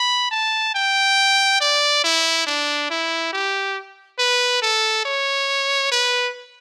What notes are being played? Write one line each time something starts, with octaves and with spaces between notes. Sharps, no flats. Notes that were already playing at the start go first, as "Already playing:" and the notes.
Already playing: B5
A5
G5
D5
E4
D4
E4
G4
B4
A4
C#5
B4